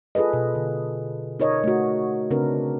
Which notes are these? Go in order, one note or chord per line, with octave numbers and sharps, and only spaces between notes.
F4 G#4 A4 B4 D#5
B2
D3
D#4 A#4 C#5 D#5
A3 F#4
C#3 C4 D4 A#4 B4